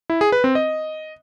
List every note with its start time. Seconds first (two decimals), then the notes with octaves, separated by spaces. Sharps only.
0.10 E4
0.21 G#4
0.32 B4
0.44 C4
0.55 D#5